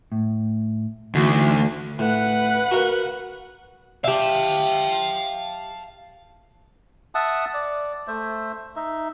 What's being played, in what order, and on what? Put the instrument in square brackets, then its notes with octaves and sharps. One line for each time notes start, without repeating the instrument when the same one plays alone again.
[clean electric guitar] A2
[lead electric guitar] D2 [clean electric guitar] E3 A3 D#4
[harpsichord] A2 [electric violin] B4 F#5
[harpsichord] F#4 A#4 F5
[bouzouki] G4 E5 [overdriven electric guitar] F5 A5
[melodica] E5 F#5 A5 D#6
D5
A3 C5 E5
D#4 E5